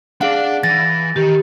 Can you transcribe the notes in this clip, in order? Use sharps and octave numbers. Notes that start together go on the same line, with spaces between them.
D4 G#4 D5 F5 F#5
E3 A6 A#6
D#3 G4